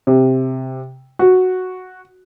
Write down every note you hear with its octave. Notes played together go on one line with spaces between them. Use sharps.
C3
F#4